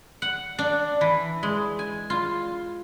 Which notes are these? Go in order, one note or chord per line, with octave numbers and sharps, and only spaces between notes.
F#5
D4
E3
G#3
G#5
F4